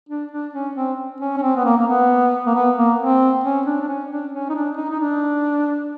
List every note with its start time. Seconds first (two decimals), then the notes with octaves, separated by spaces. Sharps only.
0.09 D4
0.31 D4
0.53 C#4
0.76 C4
1.21 C#4
1.37 C#4
1.42 C4
1.56 B3
1.65 A#3
1.78 A#3
1.88 B3
2.46 A#3
2.55 B3
2.76 A#3
2.99 C4
3.44 C#4
3.66 D4
3.81 D4
3.88 C#4
4.11 D4
4.33 C#4
4.50 D#4
4.55 D4
4.77 D#4
4.90 D#4
5.00 D4